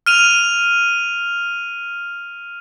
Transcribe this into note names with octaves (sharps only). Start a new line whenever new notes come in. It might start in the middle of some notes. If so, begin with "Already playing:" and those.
F6 D#7 F7